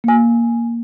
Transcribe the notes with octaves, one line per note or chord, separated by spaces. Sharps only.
A#3 G#5